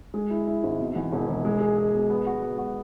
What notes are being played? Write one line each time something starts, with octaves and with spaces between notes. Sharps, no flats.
G#3
E4
E4
G#1
B2
E2
E1
E1
G#3
G#4
G#4
B2
B3
F#4
B3
F#4